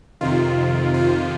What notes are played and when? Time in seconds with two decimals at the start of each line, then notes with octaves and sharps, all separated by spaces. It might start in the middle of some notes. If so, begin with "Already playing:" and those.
0.21 F2 C3 D#3 F4
0.94 F4